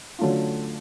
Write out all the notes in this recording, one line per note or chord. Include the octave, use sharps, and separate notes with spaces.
D3 F#3 A3 C#4 F4